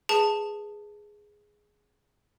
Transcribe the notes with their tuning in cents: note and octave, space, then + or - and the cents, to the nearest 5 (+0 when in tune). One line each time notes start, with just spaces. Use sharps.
G#4 +0 B4 +0 A5 +10